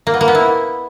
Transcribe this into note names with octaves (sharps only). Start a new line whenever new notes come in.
A#3
B3
A#3
B3
E4